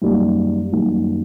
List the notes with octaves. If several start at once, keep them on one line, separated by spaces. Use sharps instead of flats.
F#2 D#3 G3 A#3
F#2 D#3 G3 A#3